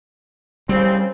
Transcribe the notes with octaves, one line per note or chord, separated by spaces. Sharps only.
C2 C#3 G3 C4